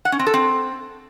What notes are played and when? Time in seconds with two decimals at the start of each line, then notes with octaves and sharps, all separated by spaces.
0.05 F#5
0.12 C#4
0.19 C4
0.27 A4
0.34 C4